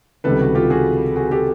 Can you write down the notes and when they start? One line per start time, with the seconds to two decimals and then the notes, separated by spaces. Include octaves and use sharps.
0.24 C#2 C3 D#3 G3 A4 B4
0.40 F#4
0.55 F4 G4
0.70 F#4 G#4
1.16 F#4 G#4
1.31 G4 A4